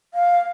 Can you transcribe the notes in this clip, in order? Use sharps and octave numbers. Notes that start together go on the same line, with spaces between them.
F5